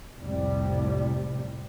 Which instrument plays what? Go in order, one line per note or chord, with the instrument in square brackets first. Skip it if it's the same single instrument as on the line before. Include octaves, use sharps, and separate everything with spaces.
[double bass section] C2 F2 A2 C3 G3